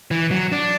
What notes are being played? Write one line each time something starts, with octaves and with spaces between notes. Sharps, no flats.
E3
F#3
D4